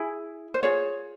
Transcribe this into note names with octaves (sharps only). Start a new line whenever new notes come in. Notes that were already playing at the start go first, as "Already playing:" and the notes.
Already playing: E4 G#4
C5
F4 G#4 C#5